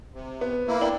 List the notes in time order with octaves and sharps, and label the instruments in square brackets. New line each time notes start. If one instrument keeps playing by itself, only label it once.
[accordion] C3
[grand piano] B3
[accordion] A#3 E4
[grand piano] D4 G5 F#7